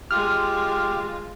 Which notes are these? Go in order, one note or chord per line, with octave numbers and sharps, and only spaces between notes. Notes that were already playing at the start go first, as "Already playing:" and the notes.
G#3 F4 G4 F6